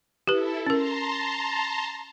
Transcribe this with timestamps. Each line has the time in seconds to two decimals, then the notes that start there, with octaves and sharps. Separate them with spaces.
0.27 E4 G4 A4 B4
0.66 C#4 A#4 A5 A#5 C6